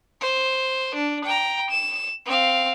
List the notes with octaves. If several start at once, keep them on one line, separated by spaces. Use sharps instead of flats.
C5
D4
G5 A#5
E7
C4 F5